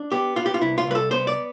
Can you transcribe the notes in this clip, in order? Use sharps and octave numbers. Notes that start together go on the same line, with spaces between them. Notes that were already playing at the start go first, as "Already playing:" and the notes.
Already playing: D4
B3 G4
B3 F4
G4
F4
C2 E4
F4
C2 B4
A4
B3 C5
D5